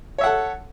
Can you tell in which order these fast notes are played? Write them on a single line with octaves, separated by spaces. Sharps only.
C#5 E5 F#5 A4